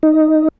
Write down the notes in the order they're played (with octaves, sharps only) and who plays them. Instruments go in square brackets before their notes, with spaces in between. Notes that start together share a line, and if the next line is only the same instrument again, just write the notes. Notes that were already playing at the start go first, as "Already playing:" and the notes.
[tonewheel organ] D#4